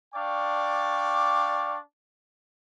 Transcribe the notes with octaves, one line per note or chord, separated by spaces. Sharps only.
D4 D5 F5 G5 C#6 D6